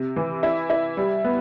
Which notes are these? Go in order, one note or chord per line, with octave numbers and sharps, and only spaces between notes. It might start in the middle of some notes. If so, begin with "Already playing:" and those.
Already playing: C3
E3
E4
E4
G3
B3